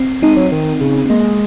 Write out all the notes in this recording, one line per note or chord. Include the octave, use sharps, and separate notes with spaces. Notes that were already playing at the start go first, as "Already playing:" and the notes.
Already playing: C4
G#3 C4 D#4
F#3
D#3
C#3
C4
G#3 A#3